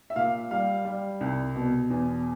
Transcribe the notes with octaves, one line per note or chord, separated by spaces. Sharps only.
E5
A#2 F5
G3 F5
G3
C2
B2
E2